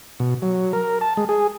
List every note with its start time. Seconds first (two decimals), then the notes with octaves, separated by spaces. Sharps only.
0.20 B2
0.42 F#3
0.73 A#4
1.01 A5
1.17 G#3
1.29 G#4